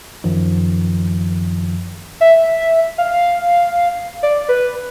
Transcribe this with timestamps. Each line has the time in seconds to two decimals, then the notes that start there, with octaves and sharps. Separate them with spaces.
0.24 F#2 D#3 F3
2.21 E5
2.98 F5
4.23 D5
4.49 B4